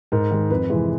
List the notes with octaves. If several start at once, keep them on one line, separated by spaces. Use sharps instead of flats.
G#2 A#4
D#3 G#3
F2 B4
C3 E3 G#3